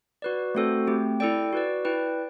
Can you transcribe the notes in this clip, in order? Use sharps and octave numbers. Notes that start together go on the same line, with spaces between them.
F#4 B4 D5
A3 C4 F#4 A4 C5
A3 C4 G4
E4 A4 D5 G5
F#4 B4 D5
E4 B4 D5 G5